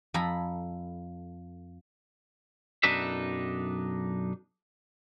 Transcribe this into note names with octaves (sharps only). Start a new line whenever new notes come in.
F2 A4 G#5 A#5 B5
B1 F#2 D4 D#4 B4 E5